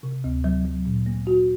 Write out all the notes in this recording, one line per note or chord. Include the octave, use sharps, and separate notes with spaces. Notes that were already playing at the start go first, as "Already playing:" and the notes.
C3
D2
F#3
F#3
A#2
A#3
F#4